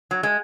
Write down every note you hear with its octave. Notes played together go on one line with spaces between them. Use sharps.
F#3
G#3